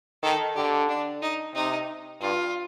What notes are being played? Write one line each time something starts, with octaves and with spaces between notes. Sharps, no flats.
D#3 A4
D3 G4
D4
D#4
C3 D#4
G2 F4